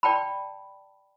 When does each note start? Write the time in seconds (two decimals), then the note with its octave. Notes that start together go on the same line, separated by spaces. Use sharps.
0.03 D5 G5 A5 B5